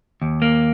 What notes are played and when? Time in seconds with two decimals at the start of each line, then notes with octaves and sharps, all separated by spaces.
0.22 D#2
0.42 A#3